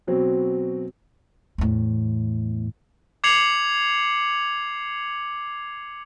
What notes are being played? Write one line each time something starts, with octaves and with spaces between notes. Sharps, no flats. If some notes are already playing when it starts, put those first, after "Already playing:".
B2 F#3 C4
E2 A2
D6 G#6 C7 C#7 F7 F#7